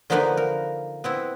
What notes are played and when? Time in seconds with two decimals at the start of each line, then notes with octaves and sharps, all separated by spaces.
0.10 D3 F3 A#3 B3 D#4 B4
0.37 A#4
1.04 B3 C4 E4